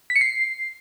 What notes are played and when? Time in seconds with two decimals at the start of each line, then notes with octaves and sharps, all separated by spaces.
0.10 B6
0.16 C#7
0.21 C7